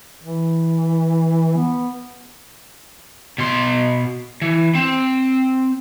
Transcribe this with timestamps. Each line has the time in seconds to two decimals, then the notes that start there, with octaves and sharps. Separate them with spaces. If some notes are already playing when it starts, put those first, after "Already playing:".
0.24 E3
1.58 B3
3.38 B2 C6
4.42 E3
4.75 C4